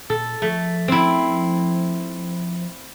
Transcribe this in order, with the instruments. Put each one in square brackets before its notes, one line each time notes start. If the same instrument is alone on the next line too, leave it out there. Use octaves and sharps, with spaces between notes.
[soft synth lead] A#2 [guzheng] A4
[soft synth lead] F3 [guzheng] A3
[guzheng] C4 E4